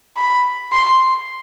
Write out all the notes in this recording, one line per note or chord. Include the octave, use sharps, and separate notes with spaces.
B5
C6